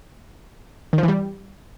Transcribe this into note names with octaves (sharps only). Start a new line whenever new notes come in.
D#3
F3
E3
G3